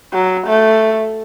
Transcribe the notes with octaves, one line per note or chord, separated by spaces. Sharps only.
F#3
A3